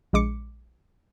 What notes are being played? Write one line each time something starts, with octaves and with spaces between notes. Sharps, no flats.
A#1 G#3 D6 C#7